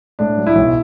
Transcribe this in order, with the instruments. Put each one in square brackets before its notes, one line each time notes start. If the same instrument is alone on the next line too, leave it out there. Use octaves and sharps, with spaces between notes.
[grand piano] A2 D4
F#3
E4
B1